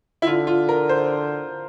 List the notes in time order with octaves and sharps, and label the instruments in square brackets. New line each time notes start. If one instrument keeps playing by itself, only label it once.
[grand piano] E4
[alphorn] D3 [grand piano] F4
[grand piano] F4
A#4
C5